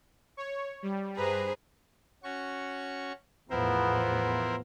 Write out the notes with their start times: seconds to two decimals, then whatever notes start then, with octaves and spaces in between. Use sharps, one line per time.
0.37 C#5
0.83 G3
1.16 G2 G#4 B4 C5 A#5
2.24 C#4 F#4 C#6
3.50 E2 A2 F3 B3 E4 A#4 C5